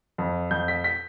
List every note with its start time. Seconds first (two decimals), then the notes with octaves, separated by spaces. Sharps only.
0.18 F2
0.51 F2 G6
0.68 B6
0.84 B6